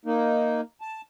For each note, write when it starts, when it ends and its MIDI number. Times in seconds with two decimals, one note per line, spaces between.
0.05 0.61 58
0.05 0.61 63
0.81 1.01 81